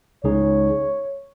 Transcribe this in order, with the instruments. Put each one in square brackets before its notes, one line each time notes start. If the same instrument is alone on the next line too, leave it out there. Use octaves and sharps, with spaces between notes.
[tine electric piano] C#2 C#3 G#3 D#4 G#4 [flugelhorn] C#5